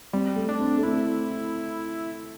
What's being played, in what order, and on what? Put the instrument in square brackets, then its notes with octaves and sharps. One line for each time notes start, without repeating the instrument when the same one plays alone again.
[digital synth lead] G3 [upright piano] C4
[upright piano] A3
[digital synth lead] D4
[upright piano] C4
A3
[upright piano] C4 [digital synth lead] E4